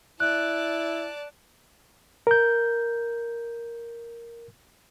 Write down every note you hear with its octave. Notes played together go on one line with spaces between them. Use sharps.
E4 D5 A5 F#6
A#4 G6